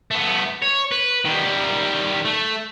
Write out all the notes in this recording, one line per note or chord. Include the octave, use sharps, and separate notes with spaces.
A3 B3
C#5
B4
D#3 G3
A3